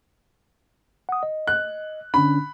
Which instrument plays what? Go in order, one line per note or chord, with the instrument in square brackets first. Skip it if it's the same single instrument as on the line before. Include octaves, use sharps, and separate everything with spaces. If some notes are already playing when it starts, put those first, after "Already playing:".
[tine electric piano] F#5 D#6
D#5
[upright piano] F#6
[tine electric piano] D3 C#4 D4 [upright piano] B5